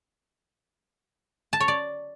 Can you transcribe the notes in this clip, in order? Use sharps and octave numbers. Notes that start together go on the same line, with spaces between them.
A5
C#5
D5